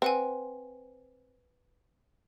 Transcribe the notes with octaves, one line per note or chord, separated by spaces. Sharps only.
C4 B4 F#5 G#5